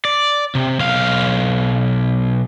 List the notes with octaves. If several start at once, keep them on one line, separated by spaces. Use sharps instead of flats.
D5
C3
B1 F5